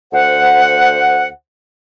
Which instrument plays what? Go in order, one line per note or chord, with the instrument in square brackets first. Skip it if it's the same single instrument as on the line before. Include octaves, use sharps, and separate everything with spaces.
[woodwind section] D2 C5 F#5